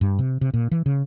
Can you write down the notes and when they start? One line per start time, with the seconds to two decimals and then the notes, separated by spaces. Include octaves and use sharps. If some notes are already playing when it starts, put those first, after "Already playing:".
0.01 G2
0.19 C3
0.41 C3
0.54 A#2
0.71 E3
0.86 C#3